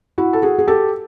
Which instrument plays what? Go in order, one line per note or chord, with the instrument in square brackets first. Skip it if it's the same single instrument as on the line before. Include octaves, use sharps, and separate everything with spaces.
[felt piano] E4 F#4
A4
F#4 G#4
G#4
G4 A4